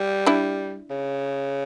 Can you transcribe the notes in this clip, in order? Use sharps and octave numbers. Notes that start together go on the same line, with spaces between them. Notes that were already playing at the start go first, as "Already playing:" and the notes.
Already playing: G3
D4 E4
C#3